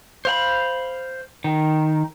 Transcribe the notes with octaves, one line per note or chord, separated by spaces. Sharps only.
C5 F5 B5
D#3